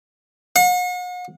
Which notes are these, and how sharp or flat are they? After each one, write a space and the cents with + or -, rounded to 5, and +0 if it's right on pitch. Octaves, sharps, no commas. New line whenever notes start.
F#5 -45